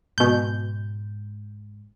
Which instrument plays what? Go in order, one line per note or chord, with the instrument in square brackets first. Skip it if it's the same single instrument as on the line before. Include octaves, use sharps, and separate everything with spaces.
[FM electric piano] G#2 [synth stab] B2 G6